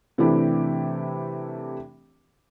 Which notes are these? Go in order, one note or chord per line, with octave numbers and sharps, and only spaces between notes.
C3 E3 A3 D4 E4 G4